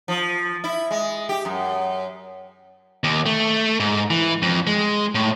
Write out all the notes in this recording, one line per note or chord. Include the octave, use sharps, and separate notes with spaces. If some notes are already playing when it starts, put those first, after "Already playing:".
F3
E4
G#3
G4
F#2
D#2
A3
G#2
E3
F2
G#3
A2